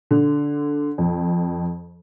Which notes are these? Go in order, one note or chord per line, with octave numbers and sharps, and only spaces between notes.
D3
F2